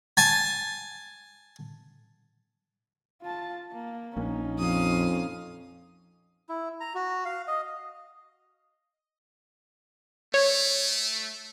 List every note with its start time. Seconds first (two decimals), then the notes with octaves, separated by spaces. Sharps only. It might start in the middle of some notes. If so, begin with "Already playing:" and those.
0.17 G#5 A5
3.22 F4 A5
3.72 A#3
4.17 A#1 A#3 C#4 D#4
4.58 F2 F5 D#6
6.49 E4
6.80 A#5
6.95 F#4
7.25 F5
7.48 D#5
10.34 A3 C#5